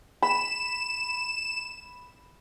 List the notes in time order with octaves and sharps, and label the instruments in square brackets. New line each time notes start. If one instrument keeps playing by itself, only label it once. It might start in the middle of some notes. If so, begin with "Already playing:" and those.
[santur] B5 [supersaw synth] E7